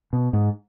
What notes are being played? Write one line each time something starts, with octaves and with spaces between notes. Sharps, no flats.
B2
G#2